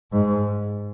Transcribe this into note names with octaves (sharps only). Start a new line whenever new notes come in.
G#2